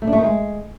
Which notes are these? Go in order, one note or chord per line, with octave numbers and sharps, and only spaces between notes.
A3
D4
A3
D#3
G#3